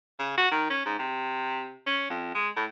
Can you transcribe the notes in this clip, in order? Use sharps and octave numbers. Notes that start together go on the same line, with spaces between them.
C#3
F#4
D#3
C#4
G#2
C3
C#4
F2
G#3
A2